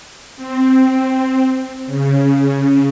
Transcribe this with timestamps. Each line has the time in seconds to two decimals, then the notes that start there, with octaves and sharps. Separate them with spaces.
0.37 C4
1.86 C#3